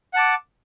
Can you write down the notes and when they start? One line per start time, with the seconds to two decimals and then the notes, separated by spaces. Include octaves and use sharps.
0.14 F#5
0.16 A5
0.19 D6